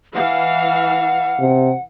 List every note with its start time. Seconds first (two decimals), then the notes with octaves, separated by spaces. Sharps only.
0.15 E3 F5 F#5
1.40 C3